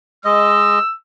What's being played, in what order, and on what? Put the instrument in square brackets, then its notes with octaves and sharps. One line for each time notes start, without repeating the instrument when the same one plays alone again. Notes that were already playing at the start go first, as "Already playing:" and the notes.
[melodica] G#3 D#5 [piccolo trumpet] E6